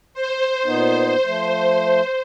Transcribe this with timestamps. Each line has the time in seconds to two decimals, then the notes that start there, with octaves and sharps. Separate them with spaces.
0.14 C5
0.66 A#2 B3 D#4
1.26 F3 A3